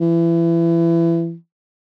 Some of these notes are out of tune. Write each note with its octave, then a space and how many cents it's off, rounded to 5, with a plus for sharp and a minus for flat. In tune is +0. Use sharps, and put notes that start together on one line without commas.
E3 +25